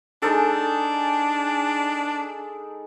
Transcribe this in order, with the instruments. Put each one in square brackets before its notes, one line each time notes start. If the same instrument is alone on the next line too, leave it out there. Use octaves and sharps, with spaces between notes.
[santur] G#3 D#4 A4 [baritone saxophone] D4